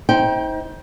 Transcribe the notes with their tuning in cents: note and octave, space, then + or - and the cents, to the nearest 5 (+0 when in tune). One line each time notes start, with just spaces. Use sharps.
D#4 +35 C5 +0 G5 +0